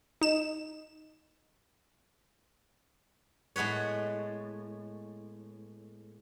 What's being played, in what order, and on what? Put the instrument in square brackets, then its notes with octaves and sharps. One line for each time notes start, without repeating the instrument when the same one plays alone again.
[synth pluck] D#4 E7
[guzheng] A2 G#3 B3 B4 C#5